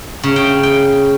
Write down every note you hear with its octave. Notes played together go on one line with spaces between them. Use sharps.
C#3
G5
G5